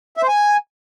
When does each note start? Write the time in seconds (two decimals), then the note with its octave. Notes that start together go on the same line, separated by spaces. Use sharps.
0.17 E5
0.23 C5
0.28 G#5